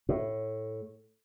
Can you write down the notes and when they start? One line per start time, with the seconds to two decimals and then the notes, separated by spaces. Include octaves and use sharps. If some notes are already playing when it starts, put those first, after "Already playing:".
0.09 A2